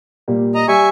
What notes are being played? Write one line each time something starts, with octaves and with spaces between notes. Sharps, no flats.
A#2 G3 A#3
D#5 A#5
G3 E5 G#5 C#6